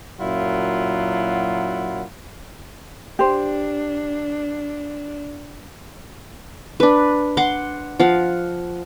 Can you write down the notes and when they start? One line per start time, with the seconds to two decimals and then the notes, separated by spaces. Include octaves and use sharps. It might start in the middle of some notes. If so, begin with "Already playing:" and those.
0.21 F#2 A#2 F#3 E4 F4 F#5
3.19 D4 G4 C5
6.80 D4 B4
7.37 F#5 C6 D6
8.00 F3 F5 F#5